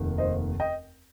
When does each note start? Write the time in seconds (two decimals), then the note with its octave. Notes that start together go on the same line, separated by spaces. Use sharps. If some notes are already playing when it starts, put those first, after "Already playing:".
Already playing: F1 D#2 D#3
0.18 C5 D#5
0.60 D#5 G5